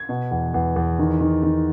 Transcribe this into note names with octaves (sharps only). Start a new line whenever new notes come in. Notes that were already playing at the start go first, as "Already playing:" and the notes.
Already playing: G#6
B2
E2
E2
E2
D#3
D#3
D#3